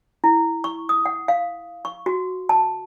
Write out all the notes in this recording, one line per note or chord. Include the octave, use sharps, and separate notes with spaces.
E4
C#6
D#6
F#5
F5
C#6
F#4
A5